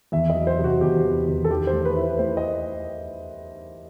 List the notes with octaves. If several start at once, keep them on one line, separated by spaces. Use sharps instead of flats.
E2 E5
D#5
F#3
C5
C3
F#4
E2 G4
B3
E2
A4
D#3 G4
C5
A3
B4
E4
C5
A3 C5
D#5